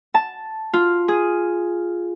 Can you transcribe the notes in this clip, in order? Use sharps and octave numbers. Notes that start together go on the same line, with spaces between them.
A5
F4
G#4